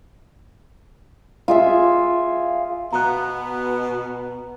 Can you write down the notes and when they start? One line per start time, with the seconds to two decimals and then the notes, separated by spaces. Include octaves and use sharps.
1.48 F4 G#4 E5
2.93 B2 B3 A#5 F#6